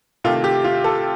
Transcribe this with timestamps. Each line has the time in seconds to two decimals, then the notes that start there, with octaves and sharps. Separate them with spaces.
0.24 C3 D#3 A3 F4
0.44 G4
0.64 F4
0.84 A4